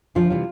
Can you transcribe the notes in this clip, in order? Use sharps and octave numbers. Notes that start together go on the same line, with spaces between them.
D2 F3 F4
C3 E3 G3